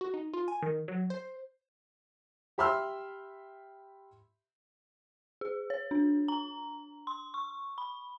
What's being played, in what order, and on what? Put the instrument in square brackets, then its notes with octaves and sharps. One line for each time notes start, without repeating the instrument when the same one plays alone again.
[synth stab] F#4
D#4
F4
G#5
D#3
F#3
C5
[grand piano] G4 E5 B5 C6 E6 F6
[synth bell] G#4
C#5
D4
A#5
C6
C#6
B5